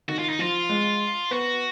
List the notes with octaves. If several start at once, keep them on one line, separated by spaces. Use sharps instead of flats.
D#3 F#4
F4
D#4
F3 F4
G#3
B3 F#4